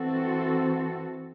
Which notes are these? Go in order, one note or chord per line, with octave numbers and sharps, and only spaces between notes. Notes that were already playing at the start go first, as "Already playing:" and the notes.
Already playing: E3 C4 F#4 A4